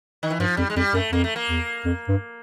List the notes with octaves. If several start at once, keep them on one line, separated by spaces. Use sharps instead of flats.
D#3
E3
G2 F3
F2 G3
G#3
F2 G3
F#2 A3
F2 A#3
A3
A#3
E2
F2
G2